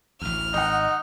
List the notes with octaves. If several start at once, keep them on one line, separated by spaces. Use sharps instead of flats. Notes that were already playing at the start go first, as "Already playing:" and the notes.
A1 D2 F6
G#1 D#4 D#5 F#5